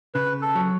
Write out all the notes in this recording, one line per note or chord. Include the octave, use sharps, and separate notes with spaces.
C#3 B4
A4
F#3